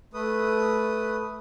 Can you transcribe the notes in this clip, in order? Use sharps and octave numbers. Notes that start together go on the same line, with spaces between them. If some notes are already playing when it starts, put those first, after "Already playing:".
A3 B4 D#6